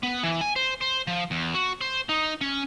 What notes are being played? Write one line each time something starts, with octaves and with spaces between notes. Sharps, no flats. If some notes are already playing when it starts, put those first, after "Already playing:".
B3
E3
G#5
C5
C5
F3
E2
F#4
C5
D#4
C#4